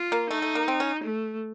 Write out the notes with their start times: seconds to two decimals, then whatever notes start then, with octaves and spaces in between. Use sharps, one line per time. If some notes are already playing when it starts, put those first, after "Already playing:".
Already playing: F4
0.12 A#3
0.30 A3 D#4
0.42 A3
0.55 A#3
0.68 C4
0.80 C#4
1.03 A3